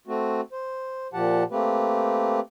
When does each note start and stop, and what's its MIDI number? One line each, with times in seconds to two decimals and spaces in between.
0.07 0.41 57
0.07 0.41 60
0.07 0.41 66
0.53 1.08 72
1.13 1.44 46
1.13 1.44 53
1.13 1.44 67
1.13 1.44 78
1.13 1.44 81
1.52 2.40 57
1.52 2.40 58
1.52 2.40 60
1.52 2.40 67
1.52 2.40 71